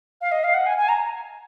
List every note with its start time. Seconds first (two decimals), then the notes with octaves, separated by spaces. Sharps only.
0.21 F5
0.31 D#5
0.44 F5
0.54 F#5
0.66 G#5
0.77 G#5
0.88 A#5